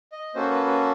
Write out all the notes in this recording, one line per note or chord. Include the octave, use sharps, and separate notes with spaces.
D#5
A#3 C#4 F#4 A4 C5
B4
B4